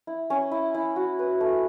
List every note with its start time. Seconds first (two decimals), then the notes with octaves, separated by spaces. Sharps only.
0.07 E4
0.30 C#4
0.52 E4
0.75 E4
0.96 F#4
1.19 B4
1.41 A3